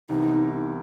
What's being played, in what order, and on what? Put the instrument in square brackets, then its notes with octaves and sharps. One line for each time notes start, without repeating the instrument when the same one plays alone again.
[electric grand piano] C2 C3 E3 B3 [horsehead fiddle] D#4